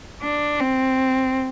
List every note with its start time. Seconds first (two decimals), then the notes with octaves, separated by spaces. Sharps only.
0.23 D4
0.60 C4